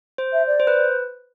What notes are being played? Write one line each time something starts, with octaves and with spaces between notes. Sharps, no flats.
C5
E5
D5
C5
B4